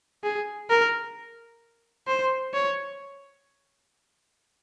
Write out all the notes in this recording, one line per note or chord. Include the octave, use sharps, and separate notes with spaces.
G#4
A#4
C5
C#5